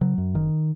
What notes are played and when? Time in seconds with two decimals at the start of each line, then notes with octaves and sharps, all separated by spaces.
0.01 C#3 F#3
0.18 F#2
0.34 F#1 D#3